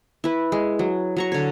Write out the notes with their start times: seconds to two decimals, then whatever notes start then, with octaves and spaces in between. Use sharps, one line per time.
0.24 E4 B4
0.52 G#3
0.79 F#3
1.17 F#3 A#5 C#6
1.32 D3 C#5